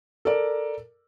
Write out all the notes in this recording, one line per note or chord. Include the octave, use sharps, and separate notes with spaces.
A4 A#4 D5